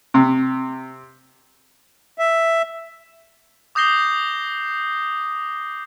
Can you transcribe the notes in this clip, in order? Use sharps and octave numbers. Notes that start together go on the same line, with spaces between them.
C3
E5
D6 D#6 G6 A#6 C7 G7